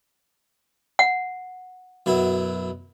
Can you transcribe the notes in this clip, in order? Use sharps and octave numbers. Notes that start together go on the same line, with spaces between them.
F#5
F#2 B2 E4